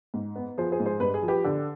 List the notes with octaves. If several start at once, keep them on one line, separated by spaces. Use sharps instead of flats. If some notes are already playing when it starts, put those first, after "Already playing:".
G#2
B3
F3 G#4 C5
G#4 C5
G#2
G#4 C5
G2 B4
G#4
F3
G4 B4
D3